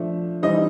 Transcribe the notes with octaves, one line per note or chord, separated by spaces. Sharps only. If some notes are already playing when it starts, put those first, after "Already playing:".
Already playing: F3 A3 D4
E3 G3 C4 D#4 D#5